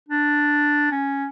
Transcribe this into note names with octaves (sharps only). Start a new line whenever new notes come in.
D4
C#4